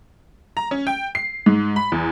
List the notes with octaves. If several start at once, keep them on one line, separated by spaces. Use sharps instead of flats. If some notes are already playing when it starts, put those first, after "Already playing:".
A#5
C#4
G5
C7
G#2
B5
E2